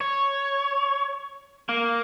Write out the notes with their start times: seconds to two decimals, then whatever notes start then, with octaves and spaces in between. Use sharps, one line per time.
0.01 C#5
1.69 A#3